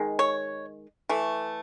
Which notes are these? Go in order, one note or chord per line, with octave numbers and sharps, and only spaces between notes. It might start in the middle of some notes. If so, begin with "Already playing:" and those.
Already playing: D#3 G#3
C#5
E3 A3